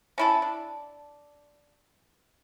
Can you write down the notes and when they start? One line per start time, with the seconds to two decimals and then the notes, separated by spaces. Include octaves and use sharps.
0.18 C#4 E4 A4
0.42 D4